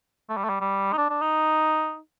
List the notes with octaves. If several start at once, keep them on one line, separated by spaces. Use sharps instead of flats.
A3
G3
A3
G3
G3
D#4
D4
D4
D#4